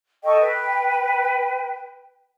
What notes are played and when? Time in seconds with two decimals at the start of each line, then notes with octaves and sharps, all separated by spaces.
0.23 A4 D#5 G5 C#6
0.41 B4